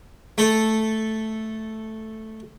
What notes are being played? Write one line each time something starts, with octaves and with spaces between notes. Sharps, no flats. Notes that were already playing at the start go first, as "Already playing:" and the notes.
A3 A4